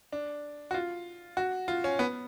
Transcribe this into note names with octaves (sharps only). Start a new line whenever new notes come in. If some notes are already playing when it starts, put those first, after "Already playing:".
D4
F#4
F4
F#4
F4
C#4
B3